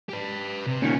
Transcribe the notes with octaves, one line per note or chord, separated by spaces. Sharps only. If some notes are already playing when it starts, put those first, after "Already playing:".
G4 B4
C3
A#2 D#3 B3 C#4